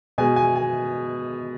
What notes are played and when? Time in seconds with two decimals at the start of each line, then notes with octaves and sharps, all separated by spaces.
0.18 B2 G#3 G#5
0.36 G#5
0.56 G#5